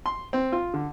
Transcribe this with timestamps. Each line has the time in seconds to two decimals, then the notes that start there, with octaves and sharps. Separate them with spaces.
0.06 C6
0.33 C4
0.52 F4
0.74 D3